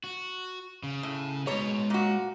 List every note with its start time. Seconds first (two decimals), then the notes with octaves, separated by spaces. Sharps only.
0.04 F#4
0.83 C#3
1.03 A2
1.47 B2 G#3 C#5 A#5
1.90 A#2 F#4